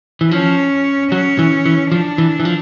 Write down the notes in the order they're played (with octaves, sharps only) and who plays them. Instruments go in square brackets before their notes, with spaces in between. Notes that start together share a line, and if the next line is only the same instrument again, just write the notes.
[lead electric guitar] E3
[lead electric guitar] F3 [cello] C#4
[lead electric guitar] F#3 [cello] C#4
[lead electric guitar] E3
E3
[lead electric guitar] F3 [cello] D4
[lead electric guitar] E3
E3
F3